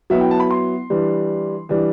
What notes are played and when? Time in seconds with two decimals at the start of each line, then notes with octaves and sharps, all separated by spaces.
0.10 F#3 B3 E4 E5
0.21 G5
0.31 A5
0.40 B5
0.51 C6
0.90 E3 G3 D4
1.69 E3 G3 D4